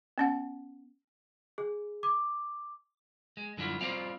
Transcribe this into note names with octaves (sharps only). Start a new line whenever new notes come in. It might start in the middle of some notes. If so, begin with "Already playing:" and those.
B3 C#4 F#5
G#4
D6
G#3
F#2 D3 G3 E4 F4
G3 C4 F4 C#5 D5 F5